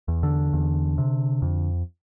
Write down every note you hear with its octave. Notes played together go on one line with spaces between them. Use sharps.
E2
D3
E2
C3
F2